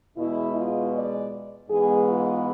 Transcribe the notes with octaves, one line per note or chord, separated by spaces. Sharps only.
E2 B2 G#3 E4
F4
D5
G#2 E3 G#3 B3 G#4
F4